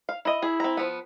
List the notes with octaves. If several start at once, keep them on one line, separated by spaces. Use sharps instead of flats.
F5
E4 D#5
E4 G#4
C4 A#5
F3 B3